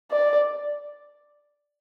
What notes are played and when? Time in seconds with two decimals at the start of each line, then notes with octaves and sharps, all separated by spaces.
0.12 D5